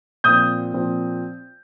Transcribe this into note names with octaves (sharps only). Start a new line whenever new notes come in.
A#2 F3 C4 D#6 G6
A#2 F3 C4